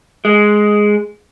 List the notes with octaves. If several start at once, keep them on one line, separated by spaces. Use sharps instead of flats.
G#3